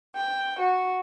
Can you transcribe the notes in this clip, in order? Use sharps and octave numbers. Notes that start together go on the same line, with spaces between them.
G5
F#4